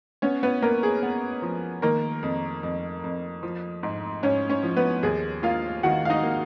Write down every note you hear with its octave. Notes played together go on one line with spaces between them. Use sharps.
B3 C#4 C#5
B3 B4
A#3 B3 A#4
G#4
B3
F3
D#3 A#3 A#4
F2
F2
F2
F3
G#2
G#2 C#4 C#5
C#4 C#5
F3
B3 B4
D#2 G#4
A#3 F4 F5
D#3 F#4 F#5
F5
D#4 D#5
A#3